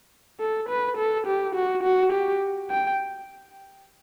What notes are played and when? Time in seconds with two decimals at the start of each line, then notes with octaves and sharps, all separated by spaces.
0.40 A4
0.69 B4
0.97 A4
1.27 G4
1.55 F#4
1.83 F#4
2.13 G4
2.70 G5